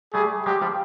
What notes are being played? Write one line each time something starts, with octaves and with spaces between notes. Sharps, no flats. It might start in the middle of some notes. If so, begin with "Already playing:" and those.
G3 A3 G#4
F#3 G#3 G4
F3 G3